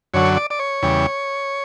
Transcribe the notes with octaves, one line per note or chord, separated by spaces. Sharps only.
F#2 D3 F#3 C#5
D5
D5
C#5
E2 C#3 G3